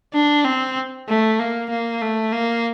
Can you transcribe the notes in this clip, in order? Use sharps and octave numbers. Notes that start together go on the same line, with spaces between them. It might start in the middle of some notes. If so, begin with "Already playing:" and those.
D4
C4
A3
A#3
A#3
A3
A#3